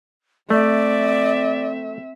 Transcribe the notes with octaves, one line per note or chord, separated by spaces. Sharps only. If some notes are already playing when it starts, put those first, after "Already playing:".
A3 C4 D5 E5